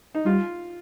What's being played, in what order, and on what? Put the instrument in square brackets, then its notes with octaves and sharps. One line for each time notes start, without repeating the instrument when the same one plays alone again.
[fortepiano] D#4
[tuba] G3 [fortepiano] F4